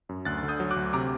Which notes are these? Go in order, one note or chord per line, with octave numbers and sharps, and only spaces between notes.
F#2
D2 F#6 A6
D3
D#6 G6
F#3
D6 F#6
D2
C3 A#5 D6